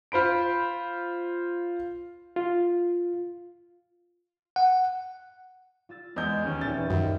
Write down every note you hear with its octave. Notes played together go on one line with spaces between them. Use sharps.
F4 C5 B5 D7
F4
F#5
F4 E6 A6
E2 G#3 D#5 G6
D#2 C#4
D#2 A#2 E5 A6
E3
F#2 D#3